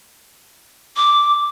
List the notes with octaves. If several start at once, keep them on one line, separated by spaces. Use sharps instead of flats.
D6